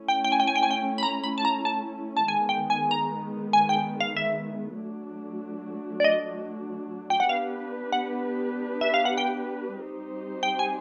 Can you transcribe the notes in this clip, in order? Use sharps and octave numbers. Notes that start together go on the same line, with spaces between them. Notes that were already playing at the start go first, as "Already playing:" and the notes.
Already playing: A3 C#4 E4
G5
G5
G#5
G5
G#5
G5
G#5
G5
B5
A#5
B5
A5
A#5
A5
A5
D#3 G#3 B3 G#5
G5
G#5
A#5
G#5
G5
F5
E5
F#3 A3 D4 F#4
D5
D#5
G5
F#5
B3 D4 G4 B4 F5
F#5
E5
F5
F#5
G5
G3 C4 D#4 G4 C5
G5
G#5